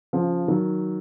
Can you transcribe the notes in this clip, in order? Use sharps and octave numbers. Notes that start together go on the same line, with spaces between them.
C#3 F3
D#3 F#3